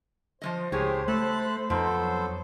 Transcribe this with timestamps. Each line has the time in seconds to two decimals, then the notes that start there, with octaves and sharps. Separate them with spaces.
0.42 F3 G3 C5 D#5
0.72 C#2 A2 G4 G#4 C#5
1.08 A3 A4 A5 B5 F#6
1.70 F2 F3 B3 D#4 A4 C5
1.95 F#3